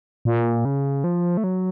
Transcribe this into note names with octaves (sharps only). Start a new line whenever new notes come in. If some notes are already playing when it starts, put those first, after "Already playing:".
A#2
C#3
F3
A3
F#3